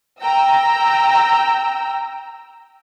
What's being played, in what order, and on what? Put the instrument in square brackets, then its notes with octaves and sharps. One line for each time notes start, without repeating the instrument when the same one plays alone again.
[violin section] G5 A#5 E6